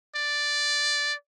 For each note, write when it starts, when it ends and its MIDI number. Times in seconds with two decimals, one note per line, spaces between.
0.15 1.13 74